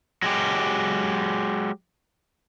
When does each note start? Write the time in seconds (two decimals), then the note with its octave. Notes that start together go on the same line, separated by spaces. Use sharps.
0.22 F#3 G#3 G4